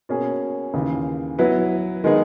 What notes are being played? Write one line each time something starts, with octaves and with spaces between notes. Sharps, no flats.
B2 A#3 C#4 G#4
D#2 C#3 E3
F#3 B3 E4 B4
D#3 G#3 B3 D#4 G#4